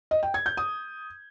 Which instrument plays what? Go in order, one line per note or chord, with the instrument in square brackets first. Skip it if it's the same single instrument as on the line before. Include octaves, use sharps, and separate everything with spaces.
[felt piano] D#5
G5
G#6
G6
D#6